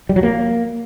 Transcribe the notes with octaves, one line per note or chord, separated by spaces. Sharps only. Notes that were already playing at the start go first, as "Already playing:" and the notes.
G3
F#3
A#3